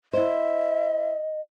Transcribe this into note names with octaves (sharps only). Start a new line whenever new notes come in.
E4 C5 D#5 E5